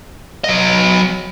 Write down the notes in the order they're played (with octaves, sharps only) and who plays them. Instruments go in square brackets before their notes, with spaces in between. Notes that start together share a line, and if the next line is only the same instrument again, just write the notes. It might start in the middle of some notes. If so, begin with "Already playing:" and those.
[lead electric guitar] F#3 D#5